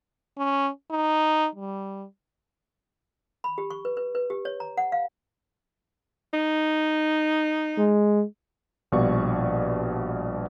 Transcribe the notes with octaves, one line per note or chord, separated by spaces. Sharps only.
C#4
D#4
G3
B5
G4
C#6
B4
B4
B4
G4
C#5
A#5
F#5
F5
D#4
G#3
A#1 B2 G3 D5 F5 C#6